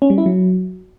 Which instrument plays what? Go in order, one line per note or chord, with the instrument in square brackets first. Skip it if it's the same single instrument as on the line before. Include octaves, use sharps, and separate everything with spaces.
[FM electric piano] C#4
G3
E4
F#3